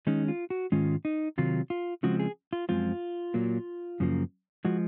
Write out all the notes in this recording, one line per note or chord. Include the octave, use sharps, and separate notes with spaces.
D#3 G#3 C#4 D#4
F4
F#4
G#2 D#3 G#3 C#4 F4
D#4
C3 D#3 F#3 F4
F4
C#3 F3 G#3 C4 F#4
G#4
F4
F#2 F3 G#3 C4 F4
A#2 F#3 A#3
F#2 C#3 F3 A#3
F3 G#3 F#4